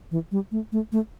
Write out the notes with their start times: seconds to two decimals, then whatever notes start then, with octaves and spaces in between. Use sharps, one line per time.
0.11 E3
0.32 G3
0.52 A3
0.72 A3
0.92 A3